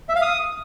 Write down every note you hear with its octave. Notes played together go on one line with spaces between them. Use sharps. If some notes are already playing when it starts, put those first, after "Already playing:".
E5
F5
D#6